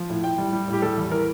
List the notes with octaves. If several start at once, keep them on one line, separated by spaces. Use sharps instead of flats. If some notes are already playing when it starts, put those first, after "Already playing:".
Already playing: F3
A2
A2 G5
G3
G3
A2
G4
G3 A4
E2
E3 A#4